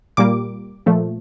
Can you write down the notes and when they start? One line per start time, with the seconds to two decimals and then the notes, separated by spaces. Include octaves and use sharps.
0.17 A#2 G3 A#3 D6
0.86 A#2 F3 A3